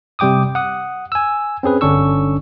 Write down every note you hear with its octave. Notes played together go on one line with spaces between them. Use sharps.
C3 G3 G5 D6 D#6
F#5 D#6
G#5 E6
C4 C#4 G#4 B4
G1 D3 C#4 D4 C#6 E6